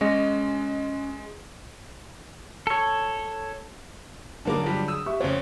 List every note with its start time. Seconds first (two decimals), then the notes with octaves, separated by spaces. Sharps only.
0.01 G#3 C#4 D#5
2.67 A4 C#5
4.45 G2 D3 F#3 A#3 G#4 D6
4.63 G2 F3 G3
4.88 D#6 E6
5.06 G4 E5 C#6
5.20 F2 C#3 C5 C#5